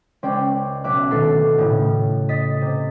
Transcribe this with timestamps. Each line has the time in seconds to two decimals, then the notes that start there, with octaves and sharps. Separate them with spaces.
0.23 C#2 C#4 C5 D5 G5
0.84 B1 C#4 E5 D6 F#6
1.11 D2 B2 D#3 A4 C7
1.58 A2 C#3
2.29 D#5 A6 B6 D#7
2.61 C3